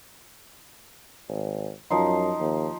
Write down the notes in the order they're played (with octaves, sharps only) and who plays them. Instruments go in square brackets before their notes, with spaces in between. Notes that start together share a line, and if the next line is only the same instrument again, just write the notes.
[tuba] G#1
[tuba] F#2 [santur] F3 D#4 C6
[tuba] D#2